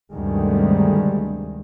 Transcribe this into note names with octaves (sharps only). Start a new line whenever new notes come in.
D2 G2 C3 D#3 G3 G#3